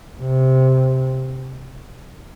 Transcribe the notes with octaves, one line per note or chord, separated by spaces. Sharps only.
C3